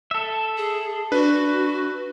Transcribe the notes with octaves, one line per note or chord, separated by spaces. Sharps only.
A4 E5
G#4
D4 F#4 B4